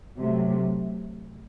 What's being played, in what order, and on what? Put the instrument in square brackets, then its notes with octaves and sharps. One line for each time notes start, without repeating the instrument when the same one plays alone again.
[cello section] C3 F#3 A3